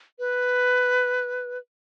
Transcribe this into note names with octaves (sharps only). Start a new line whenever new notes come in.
B4